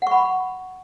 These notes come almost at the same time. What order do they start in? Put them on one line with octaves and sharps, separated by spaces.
F#5 C#6 B5